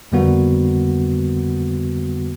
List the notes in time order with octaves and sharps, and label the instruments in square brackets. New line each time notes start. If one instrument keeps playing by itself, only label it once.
[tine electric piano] F2 D3 G3 A#3 B3 F#4